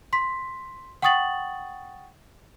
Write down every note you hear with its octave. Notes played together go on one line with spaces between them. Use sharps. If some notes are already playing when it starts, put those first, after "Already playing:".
C6 B6
F#5 G5 C#6 D#6 A6 F#7